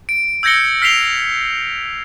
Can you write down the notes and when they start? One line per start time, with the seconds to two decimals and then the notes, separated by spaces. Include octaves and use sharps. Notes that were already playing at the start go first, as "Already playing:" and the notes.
0.09 D7
0.43 E6 G6 G#6 A#6 C#7 G7
0.82 F6 B6 C7 D7 F7 G7